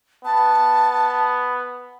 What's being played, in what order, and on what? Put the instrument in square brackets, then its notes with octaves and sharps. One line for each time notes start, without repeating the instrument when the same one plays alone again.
[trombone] B3 [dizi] A5